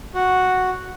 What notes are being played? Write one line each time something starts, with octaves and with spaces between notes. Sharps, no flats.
F#4